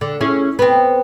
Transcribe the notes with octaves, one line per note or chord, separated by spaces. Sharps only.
D3
C#4 E4 G#4
B3 C4